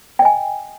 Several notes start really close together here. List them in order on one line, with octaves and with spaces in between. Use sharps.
G5 D#5 G#5